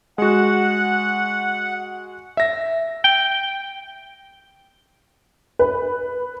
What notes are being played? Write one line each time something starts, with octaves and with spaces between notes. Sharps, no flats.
G#3 F#4 F#5
E5 A#6
G5
B4